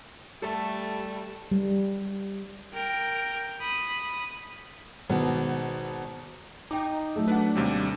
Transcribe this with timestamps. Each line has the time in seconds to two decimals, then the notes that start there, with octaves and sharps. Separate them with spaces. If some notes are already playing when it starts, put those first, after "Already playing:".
0.42 G3 A3 A4
1.52 G3
2.74 A#4 G5
3.61 B5 D#6
5.10 G#1 B2 B3
6.71 D#4 G5 D6
7.16 F#3 A3
7.28 D4 B4 F#5
7.56 D#2 C3 G3